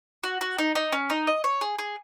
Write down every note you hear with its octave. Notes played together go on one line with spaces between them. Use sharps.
F#4
F#4
D#4
D#4
C#4
D#4
D#5
C#5
G#4
G#4